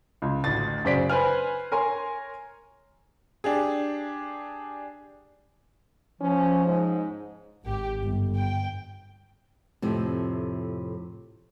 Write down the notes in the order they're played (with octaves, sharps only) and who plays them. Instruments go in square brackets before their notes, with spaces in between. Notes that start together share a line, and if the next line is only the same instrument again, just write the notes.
[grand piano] C#2
A1 D2 A6
F#2 C#3 C5 D5 B6 D7
B4 C5 G#5 F6
A#4 C#5 G#5 A#5 C6
[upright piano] D4 G4 G#4
[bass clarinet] F3 [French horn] C#4
[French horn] G#2
[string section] G#1 G4
G1
G5
[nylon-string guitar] F2 A2 C3